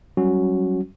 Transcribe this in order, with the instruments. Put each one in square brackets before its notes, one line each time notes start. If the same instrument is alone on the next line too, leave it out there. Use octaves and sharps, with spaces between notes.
[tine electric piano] F#3 G3 C#4 F#4